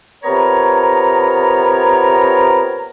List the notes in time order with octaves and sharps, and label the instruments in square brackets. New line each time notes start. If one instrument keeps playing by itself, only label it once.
[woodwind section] C3 B3 F4 A#4 C#5 A#5